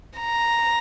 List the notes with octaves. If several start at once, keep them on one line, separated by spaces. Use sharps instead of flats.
A#5